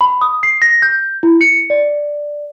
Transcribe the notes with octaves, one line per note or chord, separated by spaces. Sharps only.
B5
D#6
C7
A#6
G6
E4
C#7
D5